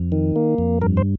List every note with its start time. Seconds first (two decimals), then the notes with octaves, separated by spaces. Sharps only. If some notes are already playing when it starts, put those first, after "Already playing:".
Already playing: F2
0.12 D#3
0.36 A#3
0.58 F2
0.81 G2 A#4
0.97 C5